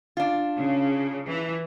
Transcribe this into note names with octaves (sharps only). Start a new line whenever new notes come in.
D4 F4
C#3
E3